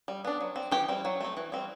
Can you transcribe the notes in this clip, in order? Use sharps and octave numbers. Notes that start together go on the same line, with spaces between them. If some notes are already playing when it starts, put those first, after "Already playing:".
G3
B3 D4
F#3
C4
E3 G4 G5
G3 C4
F#3
A3 C4
E3
G3 C4